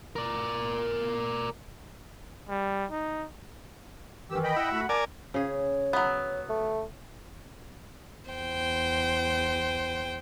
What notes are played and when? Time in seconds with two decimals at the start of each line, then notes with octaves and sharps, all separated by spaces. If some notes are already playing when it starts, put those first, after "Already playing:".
0.16 A#4 D5
2.49 G3
2.91 D#4
4.30 G2 D#3 E3 G4 E6
4.43 D#5 G5 B5
4.56 E4 F#5
4.72 A3 F#4 B5
4.89 A#4 D5 G#5 A5 D6
5.34 C#3 G#4 C#5
5.93 F#3 B3
6.49 A3
8.29 E2 C5 G5